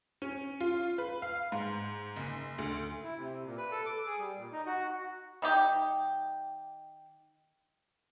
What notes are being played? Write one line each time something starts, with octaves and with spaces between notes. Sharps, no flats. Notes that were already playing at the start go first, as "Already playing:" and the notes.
C#4
F4
B4
F5
G#2
F#1
D2
E4
C3
A#2
B4
A4
D6
G#4
G3
A#2
D#4
F#4
D#3 D#4 G4